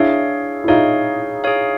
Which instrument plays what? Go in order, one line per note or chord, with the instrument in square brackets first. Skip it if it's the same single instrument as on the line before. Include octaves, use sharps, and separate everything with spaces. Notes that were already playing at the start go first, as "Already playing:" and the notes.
Already playing: [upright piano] D4 E4 [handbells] G#4 C#5 F5
[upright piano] E4
[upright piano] D#4 F4 [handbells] G#4 C#5 F5
[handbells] G#4 C#5 F5